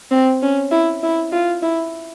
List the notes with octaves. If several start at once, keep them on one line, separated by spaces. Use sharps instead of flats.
C4
C#4
E4
E4
F4
E4